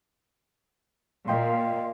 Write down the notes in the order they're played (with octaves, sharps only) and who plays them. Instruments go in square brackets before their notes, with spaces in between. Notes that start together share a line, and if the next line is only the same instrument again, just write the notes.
[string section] A#2 [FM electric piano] D#5 G5 C6 [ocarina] F5